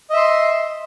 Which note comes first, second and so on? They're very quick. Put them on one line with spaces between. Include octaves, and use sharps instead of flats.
D#5 E5 C6